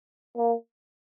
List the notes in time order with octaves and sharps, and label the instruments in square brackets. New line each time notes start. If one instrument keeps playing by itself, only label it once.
[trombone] A#3